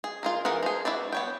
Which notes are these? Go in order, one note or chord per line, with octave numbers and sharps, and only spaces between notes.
G#4
F4 G#4 A#4
E3 G#4 A#4 F#5
F3 G#4
E4 F#4 B4 D5
B3 C#5 G5